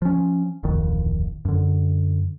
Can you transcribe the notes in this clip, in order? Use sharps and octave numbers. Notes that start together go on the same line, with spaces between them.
F3 C#4
D1 A#1 F2 D#3
F#2 D3